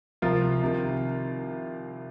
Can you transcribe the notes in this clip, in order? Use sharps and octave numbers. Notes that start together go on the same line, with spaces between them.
C2 C3 F3 F4 A#4
C2 C3 D#3